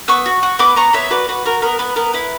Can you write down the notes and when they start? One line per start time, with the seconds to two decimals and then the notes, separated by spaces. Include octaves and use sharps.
0.08 B3 C#6 E6
0.26 F#4
0.43 F#4
0.59 B3 B5 D6
0.76 B3 A#5 C#6
0.93 B3 C#5 E5
1.10 F#4 B4 D5
1.29 F#4 B4
1.45 F#4 A#4
1.62 B3 A#4
1.79 B3 B4
1.96 B3 A#4
2.13 E4 B4